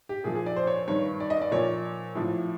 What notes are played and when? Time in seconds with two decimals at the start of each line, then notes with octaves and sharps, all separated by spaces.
0.09 G4
0.24 A#2 F3 G#4
0.35 G#4
0.46 D5
0.56 C5
0.67 C#5
0.88 G2 D#3 C#5
1.20 D5
1.30 D#5
1.42 D5
1.51 A#2 F3 C#5
2.15 A2 F3